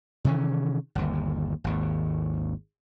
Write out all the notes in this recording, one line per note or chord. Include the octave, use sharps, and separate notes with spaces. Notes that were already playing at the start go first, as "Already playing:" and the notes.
C3 D#3 E3 C#4
G1 D#2
G#1 D#2